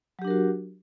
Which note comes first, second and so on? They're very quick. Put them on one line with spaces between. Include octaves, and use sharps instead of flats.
F#3 G4 D4 A#4 F#4